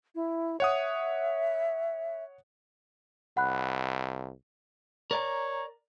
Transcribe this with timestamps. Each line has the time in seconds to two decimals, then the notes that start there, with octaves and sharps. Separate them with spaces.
0.15 E4
0.60 C#5 E5 F#5 D#6
3.37 C2 F#5 B5 F#6
5.11 A#4 C#5 D5 A#5